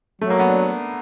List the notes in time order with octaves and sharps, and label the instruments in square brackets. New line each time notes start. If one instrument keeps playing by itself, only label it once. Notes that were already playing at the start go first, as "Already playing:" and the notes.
[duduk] F#3 [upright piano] A3
[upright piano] A#3
B3
D4